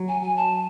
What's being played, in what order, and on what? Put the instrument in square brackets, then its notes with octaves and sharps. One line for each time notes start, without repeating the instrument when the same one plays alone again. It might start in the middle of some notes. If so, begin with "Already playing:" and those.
Already playing: [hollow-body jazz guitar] F#3
[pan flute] G#5
G#5
A5